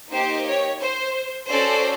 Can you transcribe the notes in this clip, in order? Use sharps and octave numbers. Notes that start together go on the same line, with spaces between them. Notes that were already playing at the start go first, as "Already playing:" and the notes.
A#3 D#4 G4 C5
C#5
C5
C#4 F#4 A4 C5 D5